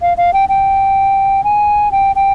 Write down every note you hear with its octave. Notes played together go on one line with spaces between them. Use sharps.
F5
F5
G5
G5
G#5
G5
G5